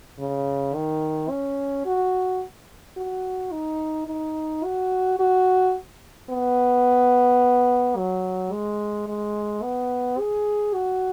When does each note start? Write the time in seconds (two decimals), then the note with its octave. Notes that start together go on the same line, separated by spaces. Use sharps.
0.19 C#3
0.75 D#3
1.30 C#4
1.86 F#4
2.97 F#4
3.52 D#4
4.07 D#4
4.64 F#4
5.19 F#4
6.30 B3
7.97 F#3
8.52 G#3
9.08 G#3
9.63 B3
10.19 G#4
10.74 F#4